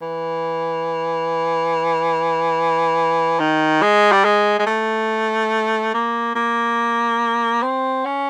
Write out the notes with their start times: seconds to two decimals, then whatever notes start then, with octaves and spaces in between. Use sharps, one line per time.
0.02 E3
3.40 D#3
3.82 G#3
4.12 G3
4.24 G#3
4.59 G#3
4.66 A3
5.94 A#3
6.35 A#3
7.63 C4
8.05 C#4